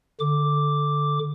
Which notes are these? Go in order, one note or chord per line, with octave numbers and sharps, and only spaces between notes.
D3 D6